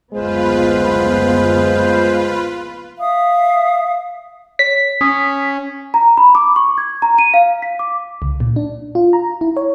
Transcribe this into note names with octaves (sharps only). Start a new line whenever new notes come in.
F#1 D2 G#3 B3 F4 B4 C5
E5 F5 D#6
C#5 B6
C#4 D#6
A#5
B5
D6
C#6
G#6
A#5
D#7
F5
B6
D6
C#2
A#2
D4
F4
A#5
E4
C#5